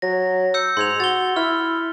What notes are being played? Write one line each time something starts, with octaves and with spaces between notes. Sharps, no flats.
F#3 A#6
E6 G6 C#7
G#2 C6 G#6 F7
F#4 A6 G7
E4 F6